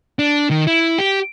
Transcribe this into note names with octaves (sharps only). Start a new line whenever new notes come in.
D4
D#3
E4
G4